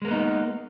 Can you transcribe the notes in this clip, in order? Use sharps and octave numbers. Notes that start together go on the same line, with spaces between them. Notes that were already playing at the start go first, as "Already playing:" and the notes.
G#3 A#3 B3 D#4